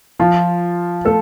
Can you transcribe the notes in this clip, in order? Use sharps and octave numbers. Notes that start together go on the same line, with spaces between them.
F3 F4
A3 A4